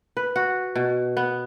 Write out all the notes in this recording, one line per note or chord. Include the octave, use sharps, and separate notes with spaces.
B4
F#4
B2
B3